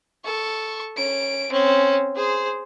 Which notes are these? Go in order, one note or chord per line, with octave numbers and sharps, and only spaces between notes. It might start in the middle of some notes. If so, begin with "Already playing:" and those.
A4 C#6
C#4 D7
C4 C#4
G#4 C5